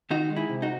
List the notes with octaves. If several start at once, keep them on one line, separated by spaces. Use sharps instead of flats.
D#3 D#4 F#4
G#3
E4 G#4
C3
D#4 F#4